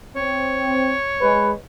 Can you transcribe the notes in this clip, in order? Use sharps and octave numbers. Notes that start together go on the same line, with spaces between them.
C4 C#5
G#3 B4